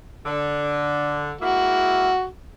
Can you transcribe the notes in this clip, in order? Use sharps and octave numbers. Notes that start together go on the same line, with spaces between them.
D3
G#3 A#3 E4 F#4